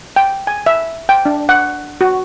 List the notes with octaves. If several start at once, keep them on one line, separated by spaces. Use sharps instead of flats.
G5
G#5
E5
G5
D4
F#5
F#4